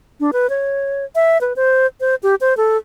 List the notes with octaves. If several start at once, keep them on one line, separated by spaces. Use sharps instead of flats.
D4
B4
C#5
E5
B4
C5
C5
G4
C5
A4